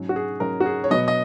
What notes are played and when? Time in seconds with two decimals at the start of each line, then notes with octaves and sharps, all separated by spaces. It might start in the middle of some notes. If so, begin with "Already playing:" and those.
Already playing: G#2 F#3 C#4
0.09 F#4
0.16 G#4
0.40 G#2 F#3 C#4 A#4
0.60 F#4
0.66 G#4
0.84 C#5
0.90 B2 F#3 B3 D#5
1.08 D#5